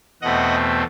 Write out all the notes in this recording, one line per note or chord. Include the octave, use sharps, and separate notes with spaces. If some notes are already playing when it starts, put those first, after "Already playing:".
E2 B2 A3 C4 D#5 F#5